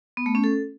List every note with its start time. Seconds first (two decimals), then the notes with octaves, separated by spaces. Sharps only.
0.17 B3
0.26 A3
0.35 C#4
0.44 A4